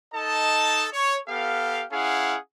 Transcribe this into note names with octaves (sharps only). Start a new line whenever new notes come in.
D#4 A4 D#5 A5
C#5
B3 G4 A4 F5
C#4 E4 G#4 F5 F#5